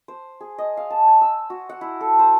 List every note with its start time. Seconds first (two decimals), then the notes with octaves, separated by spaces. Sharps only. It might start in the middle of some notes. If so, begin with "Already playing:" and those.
0.08 C5
0.41 G#4
0.58 D#5
0.77 F5
0.90 A5
1.07 G#5
1.21 E6
1.50 F#4
1.69 F#5
1.81 E4
2.01 A4
2.19 C5